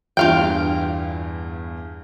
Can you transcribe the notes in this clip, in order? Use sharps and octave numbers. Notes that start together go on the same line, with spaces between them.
E2 G2 F4 F5 G5